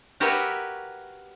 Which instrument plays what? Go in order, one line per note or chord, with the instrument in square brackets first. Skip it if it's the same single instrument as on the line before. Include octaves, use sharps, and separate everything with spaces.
[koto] F#4 G4 A#4 B4 C#5 E5